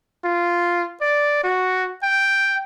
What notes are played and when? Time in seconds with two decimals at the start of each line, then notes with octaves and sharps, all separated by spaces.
0.25 F4
1.01 D5
1.44 F#4
2.03 G5